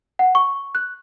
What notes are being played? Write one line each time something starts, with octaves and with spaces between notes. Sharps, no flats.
F#5
C#6
F#6